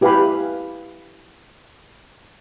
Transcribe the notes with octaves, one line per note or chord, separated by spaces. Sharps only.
E4 G4 B4 F5 G#5 B5